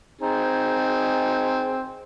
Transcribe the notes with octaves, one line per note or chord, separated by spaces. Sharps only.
C4 D#4 G#4